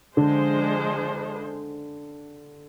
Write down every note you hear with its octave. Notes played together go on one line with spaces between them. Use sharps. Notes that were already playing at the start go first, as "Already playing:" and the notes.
D3 F3 G#3 D4 G#4 C5